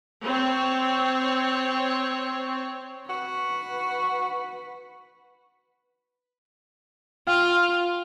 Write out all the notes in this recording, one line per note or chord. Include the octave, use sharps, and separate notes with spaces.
C4 C#5
F#4 B4
F4 F5 G5 F6